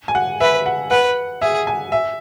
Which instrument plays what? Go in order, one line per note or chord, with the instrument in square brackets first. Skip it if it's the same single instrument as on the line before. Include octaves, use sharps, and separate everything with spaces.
[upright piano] G#5
F#5
[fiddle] B4 [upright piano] E5
[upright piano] F#5
[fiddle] B4 [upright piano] F#5
[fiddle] G#4 [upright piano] E5
[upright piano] G#5
E5